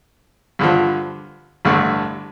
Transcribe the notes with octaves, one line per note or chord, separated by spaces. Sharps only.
G2 D3 F3
A1 G2 D3 A3